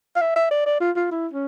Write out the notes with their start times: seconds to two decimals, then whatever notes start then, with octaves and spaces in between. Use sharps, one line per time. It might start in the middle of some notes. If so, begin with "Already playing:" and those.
0.16 F5
0.21 E5
0.36 E5
0.51 D5
0.66 D5
0.80 F4
0.96 F4
1.11 E4
1.33 C#4